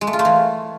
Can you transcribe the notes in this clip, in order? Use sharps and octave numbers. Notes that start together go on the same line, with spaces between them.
G#3
A3
F4
A3
E3